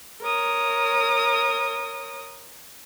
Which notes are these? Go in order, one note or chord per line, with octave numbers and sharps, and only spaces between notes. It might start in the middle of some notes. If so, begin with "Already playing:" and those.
A#4 C#5 D#6